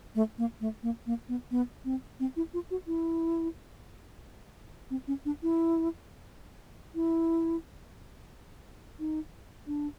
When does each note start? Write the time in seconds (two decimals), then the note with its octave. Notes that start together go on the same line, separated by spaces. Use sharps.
0.15 A3
0.38 A#3
0.61 A3
0.83 A#3
1.06 A#3
1.28 B3
1.51 B3
1.85 C4
2.20 C4
2.36 E4
2.54 F4
2.71 F#4
2.87 E4
4.90 C4
5.07 C#4
5.25 D4
5.42 E4
6.95 E4
8.99 D#4
9.67 D4